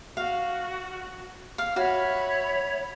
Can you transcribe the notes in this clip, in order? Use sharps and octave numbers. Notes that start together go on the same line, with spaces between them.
F#4 F5
F5
F#4 C#5 E5 B5